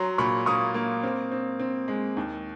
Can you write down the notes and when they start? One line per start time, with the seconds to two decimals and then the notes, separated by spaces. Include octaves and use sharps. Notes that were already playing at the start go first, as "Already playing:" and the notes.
Already playing: F#3 A#5 C6
0.18 A#2 B5 C#6
0.46 A#3 C#6 D#6
0.74 A#3
1.03 C4
1.32 C4
1.60 C4
1.88 G#3
2.17 D#2